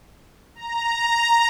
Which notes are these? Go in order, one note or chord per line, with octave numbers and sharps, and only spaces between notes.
A#5